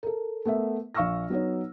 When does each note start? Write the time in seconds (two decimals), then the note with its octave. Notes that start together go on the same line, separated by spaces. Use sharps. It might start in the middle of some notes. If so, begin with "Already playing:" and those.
0.03 A4 A#4
0.45 A3 B3 A#4 E5
0.95 A#1 F5 C#6 E6 F6 A#6
1.30 F#3 B3 D#4 C#5